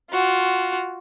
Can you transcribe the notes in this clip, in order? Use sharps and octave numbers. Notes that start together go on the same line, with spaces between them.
F4 F#4